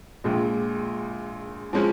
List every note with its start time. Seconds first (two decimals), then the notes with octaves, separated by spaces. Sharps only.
0.24 A#1 A#2 G#3
1.73 F3 G#3 C#4